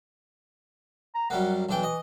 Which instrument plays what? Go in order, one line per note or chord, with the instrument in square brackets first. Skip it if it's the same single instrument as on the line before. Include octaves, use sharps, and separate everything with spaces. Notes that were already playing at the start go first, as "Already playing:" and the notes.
[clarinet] A#5
[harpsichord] F#2 G3 A#3 [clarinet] F#5
[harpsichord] B1 D4 G5 [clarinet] E3
[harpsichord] D#5